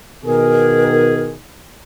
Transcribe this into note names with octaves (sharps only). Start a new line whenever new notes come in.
B2 D#3 G#4 A#4